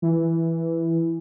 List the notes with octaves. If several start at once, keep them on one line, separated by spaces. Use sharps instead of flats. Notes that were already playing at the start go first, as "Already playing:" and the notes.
E3